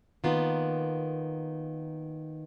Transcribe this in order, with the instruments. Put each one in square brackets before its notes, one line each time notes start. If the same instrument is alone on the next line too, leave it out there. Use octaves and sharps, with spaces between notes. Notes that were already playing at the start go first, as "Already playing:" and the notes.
[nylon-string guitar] D#3 A#3 B3 F4